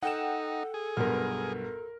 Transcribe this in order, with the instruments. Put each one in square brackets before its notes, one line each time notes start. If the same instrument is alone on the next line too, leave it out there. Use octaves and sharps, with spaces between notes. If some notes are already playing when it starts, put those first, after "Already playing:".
[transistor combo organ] D#4 [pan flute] A4 [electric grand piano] F#5 G5 E7
[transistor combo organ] G#4
[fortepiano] B1 G2 [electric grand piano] A#4 F6